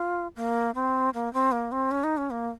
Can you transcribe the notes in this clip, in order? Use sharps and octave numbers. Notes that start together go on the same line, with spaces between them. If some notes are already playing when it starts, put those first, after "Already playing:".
Already playing: F4
A#3
C4
A#3
C4
A#3
C4
C#4
D#4
C#4
A#3